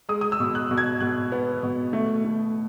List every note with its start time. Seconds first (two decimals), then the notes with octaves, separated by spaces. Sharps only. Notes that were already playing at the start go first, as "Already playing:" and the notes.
0.09 G#3 D#6
0.21 D#6
0.32 E6
0.40 B2
0.55 F#6
0.71 B2
0.78 G#6
1.00 B2 F#6
1.32 B3
1.63 B2
1.93 A3
2.24 A3